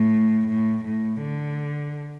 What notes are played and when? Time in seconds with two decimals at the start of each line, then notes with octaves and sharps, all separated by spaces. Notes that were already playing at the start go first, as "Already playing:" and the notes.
Already playing: A2
0.48 A2
0.85 A2
1.21 D3